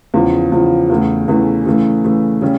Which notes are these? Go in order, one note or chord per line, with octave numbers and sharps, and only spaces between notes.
E2 C#3 F3
E2 C#3 F3
E2 C#3 E3 A3
E2 C#3 E3 A3
C#3 E3 A3
C#3 E3 A3
C#3 G3 C#4